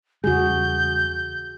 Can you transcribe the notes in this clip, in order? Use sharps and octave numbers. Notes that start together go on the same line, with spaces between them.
E2 C#3 G3 F#4 G#4 G6